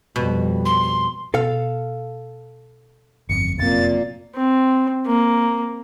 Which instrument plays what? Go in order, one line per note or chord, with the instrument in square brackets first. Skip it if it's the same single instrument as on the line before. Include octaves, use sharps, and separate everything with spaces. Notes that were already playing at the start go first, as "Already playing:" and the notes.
[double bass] F2 G3 [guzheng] B2
[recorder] C6
[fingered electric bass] B2 [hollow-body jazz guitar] A4 F5
[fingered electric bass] G1 F2 [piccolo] C#7
[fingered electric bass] F1 F#2 C4 [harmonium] A#2 A#3 [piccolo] A6
[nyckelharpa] C4
A#3